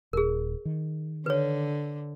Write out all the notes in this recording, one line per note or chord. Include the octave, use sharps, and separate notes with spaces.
D#1 G#4 A#4
D#3
D3 B4 C#5